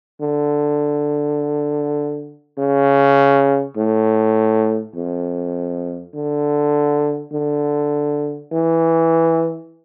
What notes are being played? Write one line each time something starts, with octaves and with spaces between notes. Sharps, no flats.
D3
C#3
A2
F2
D3
D3
E3